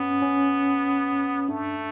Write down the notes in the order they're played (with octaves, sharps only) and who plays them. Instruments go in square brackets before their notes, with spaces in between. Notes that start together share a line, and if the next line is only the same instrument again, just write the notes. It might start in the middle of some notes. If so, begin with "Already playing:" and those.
Already playing: [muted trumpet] B3 [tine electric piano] C#4
[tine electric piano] C#4
[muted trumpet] A3 [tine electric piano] D4